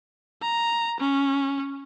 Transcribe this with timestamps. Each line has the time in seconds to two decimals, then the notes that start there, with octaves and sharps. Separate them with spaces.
0.42 A#5
1.01 C#4